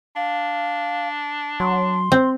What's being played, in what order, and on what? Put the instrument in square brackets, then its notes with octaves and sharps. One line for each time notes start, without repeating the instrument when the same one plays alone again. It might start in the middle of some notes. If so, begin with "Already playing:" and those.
[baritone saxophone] D4 [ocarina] F5
[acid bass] F#3 [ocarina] C6
[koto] C4